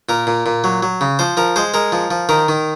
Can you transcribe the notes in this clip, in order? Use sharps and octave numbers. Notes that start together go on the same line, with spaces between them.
A#2 A#4
A#2
A#2
F#3
F#3
C#3
F3 C5
F3 A#4
G#3 C5
G#3 A#4
F3
F3
D#3 A#4
D#3